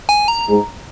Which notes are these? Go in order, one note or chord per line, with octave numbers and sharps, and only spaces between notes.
G#5
A#5
G#2 G#3